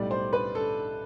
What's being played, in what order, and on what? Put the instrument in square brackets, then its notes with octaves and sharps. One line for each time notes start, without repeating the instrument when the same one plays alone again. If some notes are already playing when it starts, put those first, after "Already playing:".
Already playing: [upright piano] B1 A2 G3 D5
C5
B4
A4